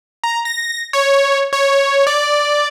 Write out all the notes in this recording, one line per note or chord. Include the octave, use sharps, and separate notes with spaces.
A#5
A#6
C#5
C#5
D5